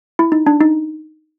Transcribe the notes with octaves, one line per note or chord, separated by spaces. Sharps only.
E4
D#4
D4
D#4